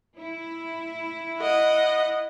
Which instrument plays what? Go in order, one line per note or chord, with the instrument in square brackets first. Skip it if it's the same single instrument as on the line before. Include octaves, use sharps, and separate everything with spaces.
[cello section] E4
[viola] D#5 F#5